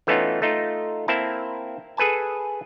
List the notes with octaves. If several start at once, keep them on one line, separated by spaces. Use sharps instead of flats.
E3 A3 B3 C#4 D#4 F4
A3 D#4 F4
A#3 C4 E4 A5
G#4 A4 B4 G#5 A5